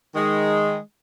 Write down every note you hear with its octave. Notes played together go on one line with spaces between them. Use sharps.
D#3 G#3